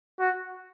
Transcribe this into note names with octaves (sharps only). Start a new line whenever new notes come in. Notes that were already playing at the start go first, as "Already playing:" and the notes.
F#4